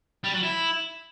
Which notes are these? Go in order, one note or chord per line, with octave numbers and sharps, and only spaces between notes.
G3
F#3
E4